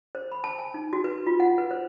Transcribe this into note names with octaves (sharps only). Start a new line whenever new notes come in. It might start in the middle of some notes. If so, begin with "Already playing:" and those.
C5
B5
A5
G#5
D#4
F#4
B4
F4
F#5
B4
C5